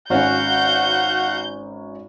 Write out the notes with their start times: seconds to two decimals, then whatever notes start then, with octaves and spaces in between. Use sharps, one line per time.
0.10 G#1 C#4 F#4 F5 F#5 G6